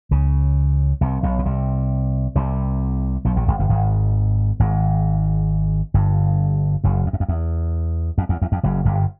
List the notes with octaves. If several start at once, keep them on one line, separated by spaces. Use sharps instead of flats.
C#2 C#3
C2 C3
B1 B2
B2
C2 C3
C2 C3
B1 B2
A#1 A#2
G#1 G#2
G1 G2
G#1 G#2
G#1 G#2
G1 G2
F#1 F#2
F2
F#2
F2
E2
F2
E2
E2
F2
F#1 F#2
G1 G2